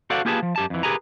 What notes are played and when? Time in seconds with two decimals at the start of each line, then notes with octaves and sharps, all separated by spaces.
0.10 F#4 A4 C5 D5 F5 F#5
0.25 A#3 F4 G4 G#4 B4 A5
0.43 F3
0.56 F#2 G4 A5
0.70 F2 E3
0.83 G4 G#4 A#4 B4 G#5 A#5